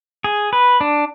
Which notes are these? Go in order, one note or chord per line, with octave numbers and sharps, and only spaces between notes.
G#4
B4
D4